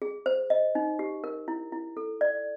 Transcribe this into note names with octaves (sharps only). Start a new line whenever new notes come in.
G#4
C5
D#5
D#4
G4
A#4
E4
E4
A4
D5